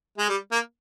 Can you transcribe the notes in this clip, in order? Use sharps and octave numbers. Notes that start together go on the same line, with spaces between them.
G#3
G3
A#3